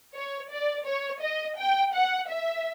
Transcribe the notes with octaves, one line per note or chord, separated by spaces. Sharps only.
C#5
D5
C#5
D#5
G5
F#5
E5